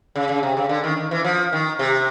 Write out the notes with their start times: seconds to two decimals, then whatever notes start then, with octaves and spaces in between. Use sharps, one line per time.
0.16 C#3
0.29 C#3
0.43 C3
0.57 C#3
0.69 D3
0.84 D#3
0.97 D#3
1.11 E3
1.24 F3
1.53 D#3
1.79 C3